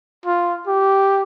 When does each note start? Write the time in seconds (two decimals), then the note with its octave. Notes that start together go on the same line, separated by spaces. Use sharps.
0.25 F4
0.67 G4